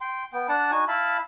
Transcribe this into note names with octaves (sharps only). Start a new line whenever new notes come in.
G5 C6
B3 G5
D4 D5 F#5 A5
D#4 F#4 G#5
E4 F5 A5 B5